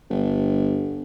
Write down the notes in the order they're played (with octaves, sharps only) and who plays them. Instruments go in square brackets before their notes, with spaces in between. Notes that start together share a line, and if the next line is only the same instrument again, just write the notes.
[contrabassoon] G1